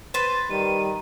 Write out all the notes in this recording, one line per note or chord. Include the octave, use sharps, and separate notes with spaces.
B4 C5 A6
D#3 G3 D#7